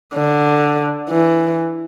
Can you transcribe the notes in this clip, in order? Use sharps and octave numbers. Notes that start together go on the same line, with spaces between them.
D3
E3